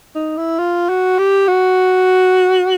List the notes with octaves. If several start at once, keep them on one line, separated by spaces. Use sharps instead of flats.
D#4
E4
F4
F#4
G4
F#4